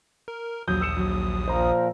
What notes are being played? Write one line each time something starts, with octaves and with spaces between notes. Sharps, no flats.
A#4
A#1 D#2 F#3 D#6 G6
E6 C#7 E7
F#3
A#2 F3 A#4 C5 A#5